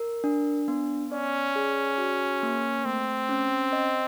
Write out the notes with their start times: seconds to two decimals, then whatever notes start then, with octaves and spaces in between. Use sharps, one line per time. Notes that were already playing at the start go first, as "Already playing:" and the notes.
Already playing: A#4
0.24 D4
0.68 B3
1.11 C#4 D5
1.56 G#4
1.98 F#4
2.43 A#3
2.85 A3 C4
3.29 C#4
3.73 D#5